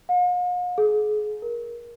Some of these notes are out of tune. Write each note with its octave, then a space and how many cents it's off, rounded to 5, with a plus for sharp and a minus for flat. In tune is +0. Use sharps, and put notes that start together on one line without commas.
F5 +45
G#4 +35
A#4 +20